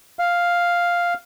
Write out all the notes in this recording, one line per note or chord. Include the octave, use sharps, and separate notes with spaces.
F5